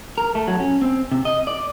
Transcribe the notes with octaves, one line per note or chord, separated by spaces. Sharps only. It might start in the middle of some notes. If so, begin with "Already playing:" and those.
A#4
A3
F#3
C#4
C4
C3
D#5
D5